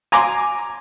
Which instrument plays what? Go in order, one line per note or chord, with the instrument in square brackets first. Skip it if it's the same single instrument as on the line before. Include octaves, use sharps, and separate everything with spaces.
[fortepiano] G#5 A#5 C6 D6